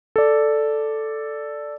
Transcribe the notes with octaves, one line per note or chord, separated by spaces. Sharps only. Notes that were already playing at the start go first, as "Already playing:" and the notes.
A4 D5